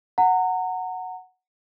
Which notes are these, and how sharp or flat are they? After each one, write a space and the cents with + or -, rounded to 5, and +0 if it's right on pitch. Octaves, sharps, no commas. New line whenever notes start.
F#5 +0 A#5 -25